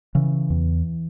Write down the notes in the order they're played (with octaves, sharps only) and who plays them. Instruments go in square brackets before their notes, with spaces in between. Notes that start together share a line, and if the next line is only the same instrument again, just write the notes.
[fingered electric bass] C#3 E3
E2